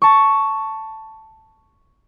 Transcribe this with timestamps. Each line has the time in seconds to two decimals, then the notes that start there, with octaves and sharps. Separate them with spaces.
0.02 A5 C#6